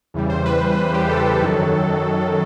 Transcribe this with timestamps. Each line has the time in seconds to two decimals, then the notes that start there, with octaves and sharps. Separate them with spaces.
0.14 E2 C#3 E3 G3
0.30 C5
0.46 B4
0.78 B4
0.94 G4
1.09 A4
1.42 F#2 D#3 F#3